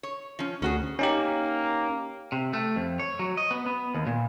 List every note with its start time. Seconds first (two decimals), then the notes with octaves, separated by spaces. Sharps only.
0.03 C#5
0.39 F3 C#4
0.62 D2 C#4 F#4 G#4
0.99 A#3 C#4 D#4 G4
2.32 C3
2.53 A3
2.76 F2
3.00 C#5
3.19 F#3
3.37 D#5
3.51 B3
3.66 B3
3.95 D#2
4.07 A#2